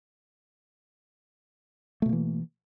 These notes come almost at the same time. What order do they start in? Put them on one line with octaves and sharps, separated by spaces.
A3 B2 A#3 E3